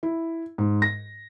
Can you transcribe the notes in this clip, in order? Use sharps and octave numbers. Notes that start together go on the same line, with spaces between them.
E4
G#2
A#6